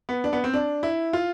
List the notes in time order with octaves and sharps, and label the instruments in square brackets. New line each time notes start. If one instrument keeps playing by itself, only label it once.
[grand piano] B3
D4
B3
C4
D4
E4
F4